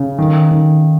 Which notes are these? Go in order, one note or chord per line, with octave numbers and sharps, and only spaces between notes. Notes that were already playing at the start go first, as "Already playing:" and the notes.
Already playing: C#3
D#3
D#3